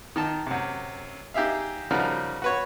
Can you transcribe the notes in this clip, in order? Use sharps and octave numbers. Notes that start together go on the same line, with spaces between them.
D#3 D#4 A5
F#2 C3
D#4 G4 G#4 E5 F5
C#3 F3 G3 D#4 F#4 A#4
F#4 B4 C#5